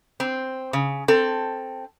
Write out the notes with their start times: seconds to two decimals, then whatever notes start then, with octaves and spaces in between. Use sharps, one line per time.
0.20 C4
0.73 C#3
1.08 C4 A4